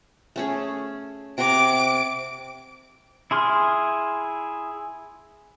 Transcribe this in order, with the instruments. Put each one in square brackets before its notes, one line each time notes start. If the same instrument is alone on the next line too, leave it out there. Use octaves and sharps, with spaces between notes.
[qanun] A3 C#4 G#4
[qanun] C3 F#5 A#5 [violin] D6 D7
[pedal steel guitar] E4 G#4 C6 F6